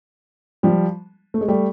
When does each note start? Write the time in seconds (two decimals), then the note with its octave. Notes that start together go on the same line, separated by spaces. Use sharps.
0.63 F3 G3
1.34 A3
1.41 G#3
1.48 G3 A3